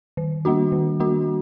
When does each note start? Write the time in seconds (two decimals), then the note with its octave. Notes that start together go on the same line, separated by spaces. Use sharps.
0.17 D#3
0.45 G3 A#3 D4 F#4
0.72 D#3
1.00 G3 A#3 D4 F#4